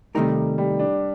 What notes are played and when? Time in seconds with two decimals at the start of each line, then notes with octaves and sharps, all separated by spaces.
0.14 C3 D#3 G3 A3 D#4 A#4
0.58 G3
0.79 D4